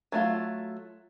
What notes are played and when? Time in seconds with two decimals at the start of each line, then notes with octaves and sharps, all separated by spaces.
0.12 F#3 A3 F4